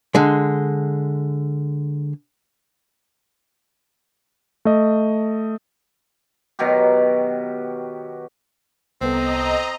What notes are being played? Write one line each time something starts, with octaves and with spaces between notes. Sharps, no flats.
D3 G#3
A3 D#5
B2 D#3 F#3 G4
C2 B3 C4 A4 D#5 A#5